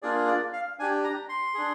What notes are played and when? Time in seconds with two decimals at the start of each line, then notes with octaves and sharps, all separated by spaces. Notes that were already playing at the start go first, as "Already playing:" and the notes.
0.02 A#3 D4 F4 G#4 D5
0.28 D5
0.53 F5
0.79 D4 G4 G#5
1.04 A#5
1.29 C6
1.54 D4 G#4